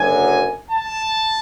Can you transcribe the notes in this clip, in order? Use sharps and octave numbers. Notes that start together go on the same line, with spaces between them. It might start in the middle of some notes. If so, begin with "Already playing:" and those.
Already playing: F#1 F#2 D3 F#3 G#5
A5